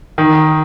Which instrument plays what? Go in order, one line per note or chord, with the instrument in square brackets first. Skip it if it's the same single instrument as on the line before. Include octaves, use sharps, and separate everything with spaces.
[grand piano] D#3